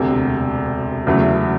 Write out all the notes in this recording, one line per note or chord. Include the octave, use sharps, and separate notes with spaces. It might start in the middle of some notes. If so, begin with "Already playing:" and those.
Already playing: E1 D2 C3
E2 C#3 F#3 A3